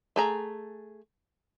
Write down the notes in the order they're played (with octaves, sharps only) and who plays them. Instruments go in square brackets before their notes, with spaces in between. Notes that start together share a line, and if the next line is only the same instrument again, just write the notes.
[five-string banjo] A3 G#4 A#5